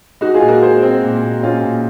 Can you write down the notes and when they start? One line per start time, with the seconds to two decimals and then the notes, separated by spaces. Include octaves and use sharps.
0.21 G#3 D#4 F#4
0.34 F4 G#4
0.41 A#2
0.48 F#4 A#4
0.62 G#3 G#4 C5
0.82 C4
1.03 A#2
1.23 A#2
1.43 A#2 C#4 F4
1.64 A#2